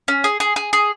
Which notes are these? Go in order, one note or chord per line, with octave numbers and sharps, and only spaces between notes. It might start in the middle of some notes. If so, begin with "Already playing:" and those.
C#4
G#4
G#4
G#4
G#4